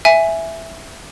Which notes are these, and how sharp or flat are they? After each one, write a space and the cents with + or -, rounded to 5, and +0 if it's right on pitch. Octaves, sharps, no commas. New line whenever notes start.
E5 +0 G#5 +0